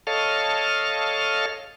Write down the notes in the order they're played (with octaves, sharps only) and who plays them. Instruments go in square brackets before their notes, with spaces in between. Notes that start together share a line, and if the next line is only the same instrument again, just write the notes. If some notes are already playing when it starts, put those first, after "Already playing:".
[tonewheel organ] A4 C#5 D#5 F5 A5 F6